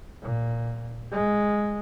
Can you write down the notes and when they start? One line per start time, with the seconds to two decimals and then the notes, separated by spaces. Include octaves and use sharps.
0.22 A#2
1.12 G#3